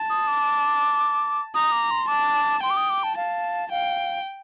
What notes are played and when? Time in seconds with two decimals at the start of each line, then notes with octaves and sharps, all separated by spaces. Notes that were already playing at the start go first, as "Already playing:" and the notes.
Already playing: A5
0.10 D#6
0.27 D6
1.54 A#5 D#6
1.72 D6
1.91 C6
2.08 A5 D6
2.63 G5 C6
2.70 D6
2.77 D#6
2.90 D6
3.03 A5
3.17 F5 A5
3.71 F5 G5